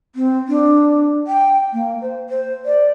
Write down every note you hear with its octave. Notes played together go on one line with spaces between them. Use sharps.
C4
D4
G5
A#3
C5
C5
D5